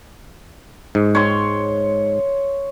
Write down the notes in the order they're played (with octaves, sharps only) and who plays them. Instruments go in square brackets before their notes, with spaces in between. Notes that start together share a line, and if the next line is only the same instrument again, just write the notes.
[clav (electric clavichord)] G#2
[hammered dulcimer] C#5 C6